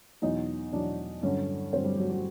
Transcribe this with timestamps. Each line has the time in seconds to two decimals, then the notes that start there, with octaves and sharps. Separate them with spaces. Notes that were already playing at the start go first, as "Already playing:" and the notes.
0.22 E2 B2 F#3 D#4 D#5
0.72 E2 B2 F#3 D4 D5
1.22 G2 D3 F#3 C#4 C#5
1.73 G2 D3 F#3 C4 C5
1.84 G3 G4
1.97 F#3 F#4
2.10 F#3 F#4